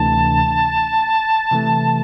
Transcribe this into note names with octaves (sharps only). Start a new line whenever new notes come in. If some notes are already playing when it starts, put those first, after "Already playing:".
Already playing: D2 C3 E3 A3 D4 A5
C3 E3 A3